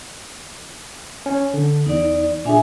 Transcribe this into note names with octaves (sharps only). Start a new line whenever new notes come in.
C#4
D3
E2 D#4 D5
A#2 D4 G#4 E5 G#5